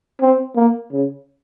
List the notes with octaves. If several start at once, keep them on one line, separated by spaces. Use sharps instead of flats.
C4
A#3
C#3